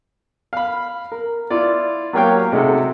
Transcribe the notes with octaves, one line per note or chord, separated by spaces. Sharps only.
F5 B5
A#4
E4 F4 D5
F#3 A#3 G4 C#5 F5 G5
C3 G#3 D#4 F#4 A4